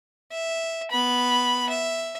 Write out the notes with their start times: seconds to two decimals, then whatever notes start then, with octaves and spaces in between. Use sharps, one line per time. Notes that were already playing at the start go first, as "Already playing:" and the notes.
0.32 E5
0.91 B3 B5
1.69 E5